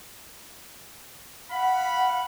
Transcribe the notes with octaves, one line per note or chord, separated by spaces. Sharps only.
F5 F#5 B5